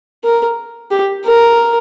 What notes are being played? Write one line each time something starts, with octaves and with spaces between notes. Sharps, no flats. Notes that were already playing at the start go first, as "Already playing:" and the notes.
A#4
G4
A#4